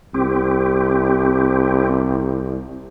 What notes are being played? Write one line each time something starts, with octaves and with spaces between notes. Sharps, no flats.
C2 C4 G4